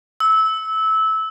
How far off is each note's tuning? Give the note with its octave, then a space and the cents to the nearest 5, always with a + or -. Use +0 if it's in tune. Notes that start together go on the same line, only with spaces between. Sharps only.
E6 -20